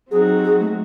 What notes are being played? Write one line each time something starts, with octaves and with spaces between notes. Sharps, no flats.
F#3 C4 D#4 F#4 G#4
G#4
G#4
A3